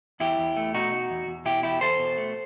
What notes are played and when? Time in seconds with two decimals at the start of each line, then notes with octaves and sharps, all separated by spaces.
0.20 E2 E4 G4
0.38 E2
0.57 A3
0.74 B2 D#4 F#4
0.92 D#4
1.10 E2
1.27 E2
1.45 B2 E4 G4
1.63 E2 E4 G4
1.81 E2 A4 C5
1.99 B2
2.18 A3